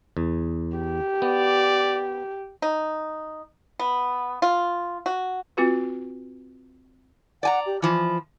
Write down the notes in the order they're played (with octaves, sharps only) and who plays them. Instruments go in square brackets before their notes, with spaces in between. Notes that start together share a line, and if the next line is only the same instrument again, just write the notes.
[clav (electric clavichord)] E2
[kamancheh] G4
[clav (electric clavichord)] B3 [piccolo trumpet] D5
[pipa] D#4
B3
F4
F#4
[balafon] C4 F4 F#4 B4
[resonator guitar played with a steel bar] D5 G#5 A#5 [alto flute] F#5
[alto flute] G4
[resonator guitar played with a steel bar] E3 F3 [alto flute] B5